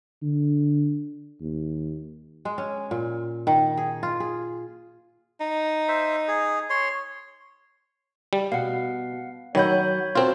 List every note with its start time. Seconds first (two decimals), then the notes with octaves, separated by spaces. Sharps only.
0.22 D3
1.41 D#2
2.45 G#3
2.58 C#4
2.91 A#2
3.47 D#3
3.77 G#4
4.03 F4
4.20 G#4
5.40 D#4
5.88 C5 E5
6.28 G#4
6.70 C#5 C6
8.33 G3
8.52 B2 F5 F#5
9.55 D#3 F#3 C#5 F#5 B5 G6
10.15 C4 F4 F#4 A4 C5